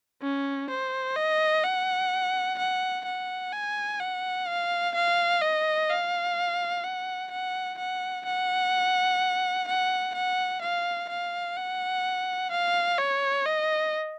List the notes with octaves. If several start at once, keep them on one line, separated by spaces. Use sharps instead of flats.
C#4
C5
D#5
F#5
F#5
F#5
G#5
F#5
F5
F5
D#5
F5
F#5
F#5
F#5
F#5
F#5
F#5
F5
F5
F#5
F5
C#5
D#5